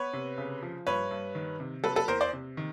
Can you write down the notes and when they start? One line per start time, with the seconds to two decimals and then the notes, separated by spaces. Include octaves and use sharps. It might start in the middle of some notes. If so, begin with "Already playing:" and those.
Already playing: B3 B4 C#5
0.13 C3
0.38 C#3
0.62 F3
0.87 G2 B4 C#5
1.11 G2
1.35 D#3
1.60 C3
1.83 F#3 A4 B4
1.96 A4 B4
2.08 E2 A#4 C5
2.21 C5 D5
2.33 C3
2.57 D#3